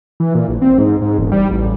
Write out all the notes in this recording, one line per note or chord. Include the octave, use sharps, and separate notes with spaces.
E3
A#2
A#1
C4
G#2
G#2
E1
G3
A1